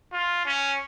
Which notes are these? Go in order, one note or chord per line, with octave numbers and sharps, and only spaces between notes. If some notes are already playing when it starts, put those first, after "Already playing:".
F4
C#4